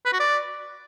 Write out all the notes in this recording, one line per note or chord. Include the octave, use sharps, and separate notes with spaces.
B4
F#4
D5